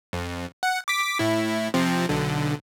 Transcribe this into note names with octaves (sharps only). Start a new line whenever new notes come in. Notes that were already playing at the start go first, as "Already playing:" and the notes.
F2
F#5
D6 B6
A2 E4
C3 F3 C4
B1 D3